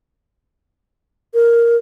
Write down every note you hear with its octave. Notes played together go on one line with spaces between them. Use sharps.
A#4